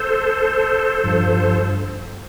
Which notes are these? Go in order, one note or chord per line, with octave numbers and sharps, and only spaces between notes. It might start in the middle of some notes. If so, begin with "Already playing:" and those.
Already playing: A4 C5
G2 F3